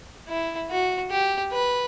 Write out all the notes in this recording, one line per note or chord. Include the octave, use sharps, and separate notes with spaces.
E4
F#4
G4
B4